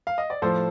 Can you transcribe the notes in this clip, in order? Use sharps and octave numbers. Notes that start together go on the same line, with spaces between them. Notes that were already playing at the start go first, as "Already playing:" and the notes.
F5
D#5
D5
A2 F3 A4 C5